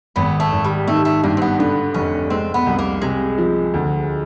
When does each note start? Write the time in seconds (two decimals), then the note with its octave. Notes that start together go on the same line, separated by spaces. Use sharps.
0.16 G#1 B3
0.40 A3
0.52 G#1
0.64 G3
0.88 D#3 A3
1.05 A3
1.23 G2 A#3
1.37 C4
1.42 B3
1.59 D3 B3
1.94 F1 C#4
2.30 G#3 C4
2.54 B3
2.66 C2
2.79 A#3
3.02 C3 G#3
3.38 F3
3.74 D2